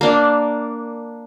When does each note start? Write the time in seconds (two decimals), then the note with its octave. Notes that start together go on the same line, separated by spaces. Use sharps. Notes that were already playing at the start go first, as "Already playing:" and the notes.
0.01 A#3 D4